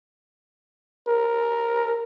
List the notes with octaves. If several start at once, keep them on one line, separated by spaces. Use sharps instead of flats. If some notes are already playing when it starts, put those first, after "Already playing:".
A#4